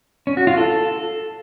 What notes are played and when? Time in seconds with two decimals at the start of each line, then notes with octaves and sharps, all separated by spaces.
0.27 C#4
0.37 F#4
0.47 F4
0.57 A4